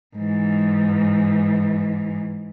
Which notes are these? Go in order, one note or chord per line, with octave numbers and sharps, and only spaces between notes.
G#2 E3